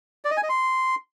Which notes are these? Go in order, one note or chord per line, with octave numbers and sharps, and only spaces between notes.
D5
D#5
G#5
D#5
C6